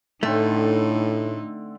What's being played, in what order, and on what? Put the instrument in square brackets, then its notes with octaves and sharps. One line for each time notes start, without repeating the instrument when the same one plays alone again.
[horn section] A2 [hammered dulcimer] D3 C4 [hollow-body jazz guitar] A3 [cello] D#4